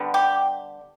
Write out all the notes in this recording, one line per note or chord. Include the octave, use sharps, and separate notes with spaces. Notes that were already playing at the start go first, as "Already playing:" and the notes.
Already playing: D3 G3 B3
G4